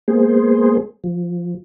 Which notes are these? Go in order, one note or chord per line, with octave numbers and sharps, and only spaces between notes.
G#3 A#3 B3 G#4 C5
F3